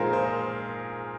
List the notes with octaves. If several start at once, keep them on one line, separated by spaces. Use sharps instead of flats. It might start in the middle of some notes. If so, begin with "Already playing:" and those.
Already playing: A#2 F3 G#3 D#4 F4 G#4 A#4 C5
C5